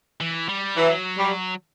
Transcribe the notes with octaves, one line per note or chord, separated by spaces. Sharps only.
E3
G3
E3 F#3
G3